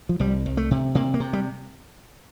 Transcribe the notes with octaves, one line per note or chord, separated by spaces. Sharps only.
F3
C2 G3
C2
A3
C3
C3 A#3
A#3
C3
G3